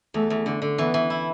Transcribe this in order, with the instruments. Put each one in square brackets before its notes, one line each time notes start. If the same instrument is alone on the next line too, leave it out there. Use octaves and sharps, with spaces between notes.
[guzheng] E2 [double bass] A3
[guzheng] E2
D3
D3
[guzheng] E3 [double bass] B3
[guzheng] E3
E4